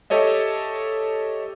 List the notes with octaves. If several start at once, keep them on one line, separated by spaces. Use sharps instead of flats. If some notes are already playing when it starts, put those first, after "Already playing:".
G4 A4 C#5 D#5 E5